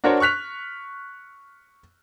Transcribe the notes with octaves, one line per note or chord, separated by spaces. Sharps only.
D4 F#4 A#4 C5 C#5
C#6 F6 F#6 B6 F7